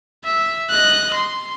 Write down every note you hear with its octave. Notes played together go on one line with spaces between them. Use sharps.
E5
D#5 F#6
C6